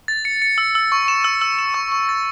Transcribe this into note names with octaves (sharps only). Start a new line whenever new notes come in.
A6
C#7
C#7
E6
E6
C#6
E7
E6
E6
E7
C#6
C#6
A6